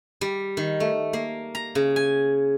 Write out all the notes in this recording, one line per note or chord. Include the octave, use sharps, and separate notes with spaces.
G3
D#3
A3
A#3
A#5
C#3
G#5